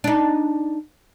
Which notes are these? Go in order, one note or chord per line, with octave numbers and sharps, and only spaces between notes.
D4 D#4